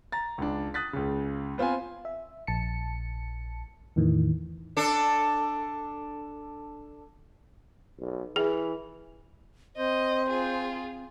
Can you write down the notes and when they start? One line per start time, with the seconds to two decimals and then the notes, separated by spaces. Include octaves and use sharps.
0.12 A#5 A6
0.38 C#2 D4
0.74 D#6 F#6 A6 B6
0.93 C#2 C#3
1.58 B3 C4 F4 C5 G#5
2.05 E5
2.47 A#1 A5 C#7
3.96 E2 A2 D#3 E3
4.77 D4 A4
7.99 B1
8.36 E3 G#4
9.77 C4 C5 D#5
10.29 F4 G#4